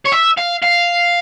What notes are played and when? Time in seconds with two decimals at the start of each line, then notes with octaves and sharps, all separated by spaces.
0.06 C#5
0.12 E5
0.38 F5
0.63 F5